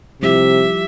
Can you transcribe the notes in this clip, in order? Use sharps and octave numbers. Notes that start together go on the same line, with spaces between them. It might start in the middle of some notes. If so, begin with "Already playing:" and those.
C3 F3 G3 E4 G4 E5